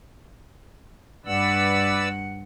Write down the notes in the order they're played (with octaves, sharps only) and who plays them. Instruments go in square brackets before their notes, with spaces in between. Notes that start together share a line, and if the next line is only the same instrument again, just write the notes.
[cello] G2 F#5 [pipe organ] B4 D5 E6